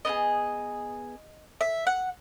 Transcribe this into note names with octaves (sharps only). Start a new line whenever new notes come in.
B3 E4 G#4 D#5
E5
F#5